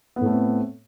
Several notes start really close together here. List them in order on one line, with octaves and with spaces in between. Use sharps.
B3 A2 A3 C4